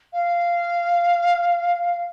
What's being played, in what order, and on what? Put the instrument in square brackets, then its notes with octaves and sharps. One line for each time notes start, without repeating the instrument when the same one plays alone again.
[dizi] F5